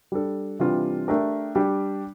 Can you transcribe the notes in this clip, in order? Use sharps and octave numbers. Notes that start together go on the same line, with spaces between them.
G3 D4 A4
C3 E3 G3 D4 F4
A3 D4 G4 A#4
G3 D4 G4